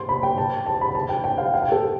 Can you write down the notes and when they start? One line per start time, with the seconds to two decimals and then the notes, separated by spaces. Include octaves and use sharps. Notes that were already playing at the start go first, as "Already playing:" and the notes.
Already playing: C6
0.09 B5
0.23 G5
0.38 A5
0.66 A5
0.81 B5
0.95 A5
1.09 G5
1.24 G5
1.38 F5
1.54 F5
1.62 G5
1.72 A4